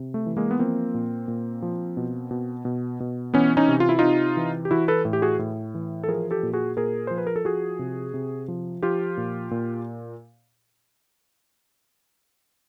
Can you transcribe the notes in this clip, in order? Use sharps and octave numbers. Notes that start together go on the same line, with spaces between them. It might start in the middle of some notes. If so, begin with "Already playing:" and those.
Already playing: C3
A3
E3
G#3 A#3
B3
F3 A#3 C4
A#2
A#2
F3
B2
B2
B2
B2
E3 B3 C#4
C#4 D#4
C3
F4
E4
C3 D#4 F4
E3
G4
E3 E4 F#4
A4 B4
A2
G4
F#4 G#4
A2
E3
A4
F3 G#4 A#4
G4 A4
A#2
F#4 G#4
A#2 G#4 A#4
F3 C5
B4
A#4
A4
F3 F#4 G#4
C3
C3
F3
F3 F4 G4
A#2
A#2